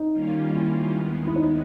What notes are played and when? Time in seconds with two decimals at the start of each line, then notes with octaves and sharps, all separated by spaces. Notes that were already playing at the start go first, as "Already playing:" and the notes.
Already playing: D#4
0.12 D#3 G3 A#3 C#4 F4
0.54 E4
0.95 D#2 D#3 G#3 B3
1.27 E4
1.36 D#4